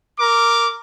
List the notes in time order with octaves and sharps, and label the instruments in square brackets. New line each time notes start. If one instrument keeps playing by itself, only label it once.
[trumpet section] A#4 D6